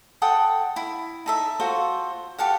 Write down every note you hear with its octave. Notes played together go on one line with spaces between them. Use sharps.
A4 F#5 G5 D#6
E4
D#4 A4 E5
F4 F#4 A4 C5
G4 A4 F5 F#5